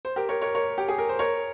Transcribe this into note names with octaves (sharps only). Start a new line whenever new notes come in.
C5
G4 A#4
A#4 C#5
A#4 C#5
A#4 C#5
G4
G#4
A#4
C5
A#4 C#5